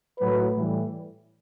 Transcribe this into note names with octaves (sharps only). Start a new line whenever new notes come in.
A2 F#3 B4
A2 E3 G3